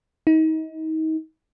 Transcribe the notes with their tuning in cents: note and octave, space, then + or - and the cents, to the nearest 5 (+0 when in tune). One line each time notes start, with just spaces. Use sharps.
D#4 +30